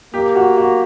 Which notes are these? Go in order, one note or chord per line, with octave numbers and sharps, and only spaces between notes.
A#3 G4
F#4
F#4